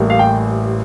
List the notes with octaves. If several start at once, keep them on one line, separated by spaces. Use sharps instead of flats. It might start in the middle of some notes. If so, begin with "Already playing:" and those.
Already playing: A1 A2 G3 A#3
F5
G5